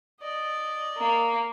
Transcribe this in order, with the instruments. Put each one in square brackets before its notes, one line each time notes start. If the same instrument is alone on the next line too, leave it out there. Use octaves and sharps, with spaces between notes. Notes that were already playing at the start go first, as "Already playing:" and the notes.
[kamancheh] D5 D#5
[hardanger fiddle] A#3